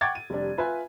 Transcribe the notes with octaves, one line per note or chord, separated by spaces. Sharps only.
F#5 G5 C#6 D6 G#6 A6
D#7
F1 G3 D4
F4 B4 E5 G#5